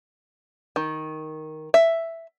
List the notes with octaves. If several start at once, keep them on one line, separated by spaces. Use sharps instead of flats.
D#3
E5